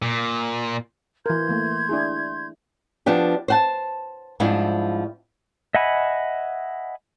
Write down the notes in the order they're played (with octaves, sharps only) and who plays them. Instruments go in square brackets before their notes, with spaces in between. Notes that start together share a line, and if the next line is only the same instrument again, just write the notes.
[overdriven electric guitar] A#2
[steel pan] E3 A#4 [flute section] C6 G6 G#6
[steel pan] E3 A3 A#3
D4 E4 G#4
[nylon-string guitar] F3 B3 D4 G4
C5 F#5 A5
G#2 F3 G3 C4 D4 E4
[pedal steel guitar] D#5 E5 F#5 G#5 B5